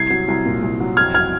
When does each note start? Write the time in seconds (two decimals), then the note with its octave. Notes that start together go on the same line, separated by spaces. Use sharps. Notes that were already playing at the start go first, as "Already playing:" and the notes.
Already playing: C2 G#6 C7
0.10 F#3
0.28 C2
0.45 A#2
0.62 C2
0.80 F#3
0.97 F2 F6 G#6
1.14 F#3 F6 G#6